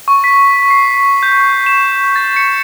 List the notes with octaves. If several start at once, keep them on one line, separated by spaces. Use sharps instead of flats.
C#6
B6
C7
G6
E7
A6
C#7